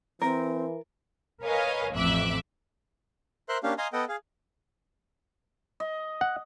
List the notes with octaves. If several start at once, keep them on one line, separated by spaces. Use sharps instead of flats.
E3 C4 A#4
A#4 B4 C#5 D#5 F5 G#5
A1 F2 E5 D6 E6 F#6
A#4 C5 E5 C6 F#6
A#3 C#4 D4 G4 F5
D#5 F5 G#5 A#5 C6 D#6
B3 A4 D#5 F#5 G5
G#4 F5
D#5
F#5